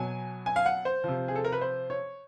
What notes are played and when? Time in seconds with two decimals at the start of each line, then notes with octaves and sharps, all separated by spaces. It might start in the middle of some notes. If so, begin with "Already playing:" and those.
Already playing: B2 F#3 G#5
0.46 G#5
0.56 F5
0.66 F#5
0.85 C5
1.04 C3 F3
1.28 G#4
1.36 A4
1.45 A#4
1.52 B4
1.61 C5
1.90 C#5